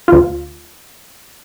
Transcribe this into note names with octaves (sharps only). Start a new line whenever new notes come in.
D2 F4